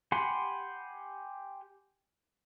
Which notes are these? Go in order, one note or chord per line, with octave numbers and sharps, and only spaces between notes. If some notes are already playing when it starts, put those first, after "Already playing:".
G4 F#5 G#5 B5 C6